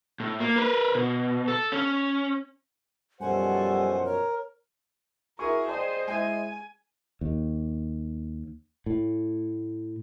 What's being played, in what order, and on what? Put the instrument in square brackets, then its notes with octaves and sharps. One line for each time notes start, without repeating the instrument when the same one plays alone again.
[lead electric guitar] A2
A#3
A#4 B4
B2
A4
C#4
[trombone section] F#2 B2 F3 [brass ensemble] G3 A4 [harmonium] C5 F#5 [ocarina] G#5
[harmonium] A#4 [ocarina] C#5
[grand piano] E4 F#4 C#6 [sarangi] G#4 [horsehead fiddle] A#4
[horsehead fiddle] C5 D#5 [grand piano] D5 G5 A5
[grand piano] G#3 E4 [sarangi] G#5
[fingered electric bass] D#2
A2